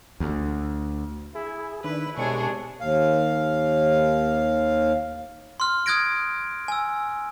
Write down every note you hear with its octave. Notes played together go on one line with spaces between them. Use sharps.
D2
E4 G#4
D#3 D4 E4 B4
C2 B2 G#3 D4 G#4 C#5 C#6
D#2 F5
C6 F6
D#6 F#6 G#6 A#6 D7
G#5 E6